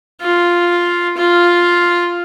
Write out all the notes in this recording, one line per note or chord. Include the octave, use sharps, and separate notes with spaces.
F4
F4